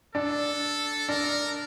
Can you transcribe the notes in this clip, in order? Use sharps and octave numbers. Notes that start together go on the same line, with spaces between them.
D4 A4
D4 A#4